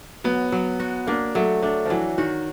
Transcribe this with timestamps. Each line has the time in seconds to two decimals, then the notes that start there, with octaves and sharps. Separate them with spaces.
0.24 F#3 B3
0.52 F#3
0.80 F#4
1.07 A#3 D4
1.35 F#3 A3
1.62 A3 D4
1.85 F3
1.90 E3 F#3
2.18 D#3 F#4